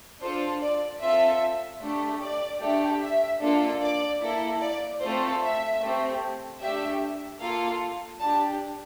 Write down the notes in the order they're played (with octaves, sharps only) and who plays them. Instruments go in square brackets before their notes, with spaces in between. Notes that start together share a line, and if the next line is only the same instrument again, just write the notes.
[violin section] D4 F4 A4 C5
D5
C4 F4 A4 E5
A3 D4 G4
D5
A3 D4 G4
E5
A#3 D4 F4 A4
D5
A#3 E4 A4
D5
A3 C4 F4 A4 C5
E5
A3 C4 G4
A3 D4 G4 E5
A#3 F4 A4 F5
D4 G4 A5